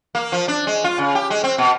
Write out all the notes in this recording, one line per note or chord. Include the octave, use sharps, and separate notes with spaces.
A#3
F3
D4
G#3
F4
C#3
G4
G#3
C4
B2